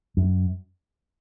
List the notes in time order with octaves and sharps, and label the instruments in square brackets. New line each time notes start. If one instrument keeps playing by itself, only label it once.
[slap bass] F#2